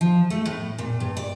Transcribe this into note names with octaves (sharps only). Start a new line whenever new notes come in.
F3
A3
A2
A#2
G2
D5